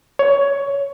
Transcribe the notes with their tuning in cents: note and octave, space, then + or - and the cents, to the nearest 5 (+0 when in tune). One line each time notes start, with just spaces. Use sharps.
C#5 +15